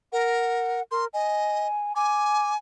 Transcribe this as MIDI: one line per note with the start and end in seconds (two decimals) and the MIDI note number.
0.12 0.81 70
0.12 0.82 78
0.91 1.07 70
0.91 1.05 84
1.14 1.68 75
1.14 1.95 80
1.96 2.57 80
1.96 2.52 86